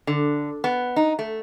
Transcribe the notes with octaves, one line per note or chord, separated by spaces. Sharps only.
D3
B3
D#4
A3